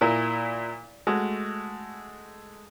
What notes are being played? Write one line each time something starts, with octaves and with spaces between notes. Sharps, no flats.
A#2 A#3 E4
G#3 A3 F#4